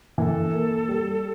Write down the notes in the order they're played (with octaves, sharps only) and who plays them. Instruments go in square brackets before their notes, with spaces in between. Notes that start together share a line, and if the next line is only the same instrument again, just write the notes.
[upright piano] E3 [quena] A#4
[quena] A4
[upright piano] A#3
G3